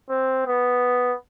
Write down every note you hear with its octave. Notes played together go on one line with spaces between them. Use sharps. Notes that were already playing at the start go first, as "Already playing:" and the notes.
C4
B3